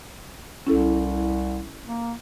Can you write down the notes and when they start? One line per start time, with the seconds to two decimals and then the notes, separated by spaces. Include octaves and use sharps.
0.67 C2 C#4 E4 A4
1.86 A#3